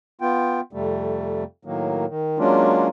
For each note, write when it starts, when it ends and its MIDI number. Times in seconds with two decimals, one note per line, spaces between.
0.21 0.61 59
0.21 0.61 65
0.21 0.61 79
0.73 1.44 41
0.73 1.44 48
0.73 1.44 55
0.73 1.44 57
1.65 2.05 45
1.65 2.05 51
1.65 2.05 54
1.65 2.05 58
2.08 2.38 51
2.39 2.88 54
2.39 2.88 56
2.39 2.88 58
2.39 2.88 61
2.39 2.88 62
2.39 2.88 65